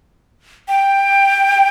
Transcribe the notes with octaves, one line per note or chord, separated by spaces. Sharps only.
G5